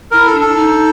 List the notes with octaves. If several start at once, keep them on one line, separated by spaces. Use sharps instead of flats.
E4 A#4
A4
D4
A4
D#4